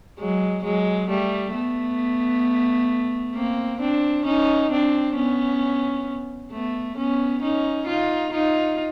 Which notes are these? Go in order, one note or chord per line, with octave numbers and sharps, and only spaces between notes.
F#3 G#3
F#3 G#3
G3 A3
A3 B3
A#3 C4
C4 D4
C#4 D#4
C4 D4
B3 C#4
A3 B3
B3 C#4
C#4 D#4
D#4 F4
D#4 F4